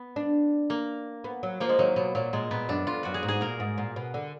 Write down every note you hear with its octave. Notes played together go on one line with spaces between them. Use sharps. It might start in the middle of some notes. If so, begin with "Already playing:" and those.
Already playing: B3
D4
A#3
B3
F#3
F3 A#3
G#3
D#3 F#3
B2 F#3
A#2 F#3
A#2 G#3
A#2 B3
F#2 D4
F2 F4
F#2 F#4
G#4
G#2
G#4
A#2 A#4
G#2
A#2
B2
D3